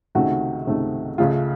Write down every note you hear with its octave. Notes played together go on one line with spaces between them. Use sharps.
C#2 C3 D#3 A3 F#4
C#2 C3 D#3 A3
C#2 C#3 A3 F4